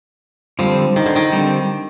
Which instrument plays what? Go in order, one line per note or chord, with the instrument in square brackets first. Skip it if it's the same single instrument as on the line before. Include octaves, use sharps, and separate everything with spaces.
[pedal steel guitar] D3 G3 C4 [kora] F3
[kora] D#3
D3
D#3
[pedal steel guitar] D3 G3 C4